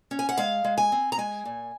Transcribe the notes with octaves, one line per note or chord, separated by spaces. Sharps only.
C#4
G#5
F#5
G#3 F5
G#3
G#5
C4
A#5
G#3 G#5
A#2